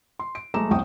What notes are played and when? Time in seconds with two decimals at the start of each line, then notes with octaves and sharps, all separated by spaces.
0.19 C6
0.35 D7
0.54 F#1 G#3 A3 A#5 D6 E7
0.71 G1 C2 F2 G5 C#6 D#6